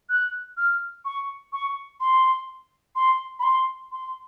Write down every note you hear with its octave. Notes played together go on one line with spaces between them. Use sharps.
F#6
F6
C#6
C#6
C6
C6
B5
C6
C6